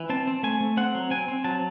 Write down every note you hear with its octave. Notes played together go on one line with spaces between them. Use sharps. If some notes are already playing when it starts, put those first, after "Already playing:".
Already playing: E3
C4 A5
C4
A3 G#5
A3
C4 F#5
F#3
C4 G#5
C4
F#3 A5